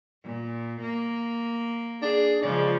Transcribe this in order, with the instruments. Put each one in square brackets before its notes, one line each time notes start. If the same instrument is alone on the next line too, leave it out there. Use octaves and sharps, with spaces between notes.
[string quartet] A#2
A#3
[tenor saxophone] D4 [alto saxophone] G#4
[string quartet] C#3 F3 [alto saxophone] G#3 [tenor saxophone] D5